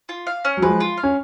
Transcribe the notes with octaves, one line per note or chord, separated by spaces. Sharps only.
F4
F5
C#4
F#3
F3 G#3 B4
F4
F5
C#4